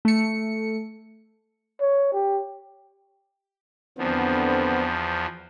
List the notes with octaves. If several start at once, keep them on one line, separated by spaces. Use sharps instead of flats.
A3 C#7
C#5
G4
E2 D3 F3 B3 C4